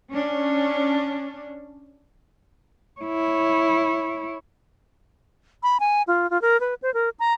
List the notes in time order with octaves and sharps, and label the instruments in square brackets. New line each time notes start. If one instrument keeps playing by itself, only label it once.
[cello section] C#4 D4
[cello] E4 C#5
[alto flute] B5
G#5
F4
F4
A#4
B4
C5
A#4
A#5